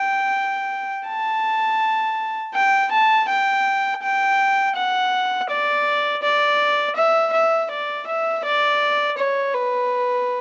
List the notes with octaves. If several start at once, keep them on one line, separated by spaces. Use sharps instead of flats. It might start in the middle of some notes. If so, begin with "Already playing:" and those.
Already playing: G5
A5
G5
A5
G5
G5
F#5
D5
D5
E5
E5
D5
E5
D5
C#5
B4